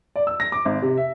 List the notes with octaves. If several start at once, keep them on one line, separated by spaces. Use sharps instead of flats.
D5
E6
A#6
D6
G#1
C3
E5